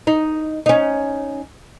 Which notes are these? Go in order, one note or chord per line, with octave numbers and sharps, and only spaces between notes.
D#4
C#4 D#4